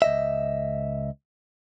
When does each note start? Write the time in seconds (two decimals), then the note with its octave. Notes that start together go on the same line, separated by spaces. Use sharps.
0.02 C#2 D#5 E5